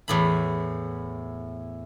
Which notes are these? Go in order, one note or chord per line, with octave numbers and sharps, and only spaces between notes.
E2 A2 B5